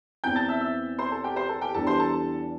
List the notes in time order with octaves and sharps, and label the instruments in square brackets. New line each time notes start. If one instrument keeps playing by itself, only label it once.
[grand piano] E2 E3 C4 [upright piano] G5 G6
[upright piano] A5 A6
E5 E6
E5 E6
C5 C6
A4 A5
G4 G5
C5 C6
A4 A5
G4 G5
[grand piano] E2 E3 G3 D4 G4 [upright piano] A4 A5
[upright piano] C5 C6
A4 A5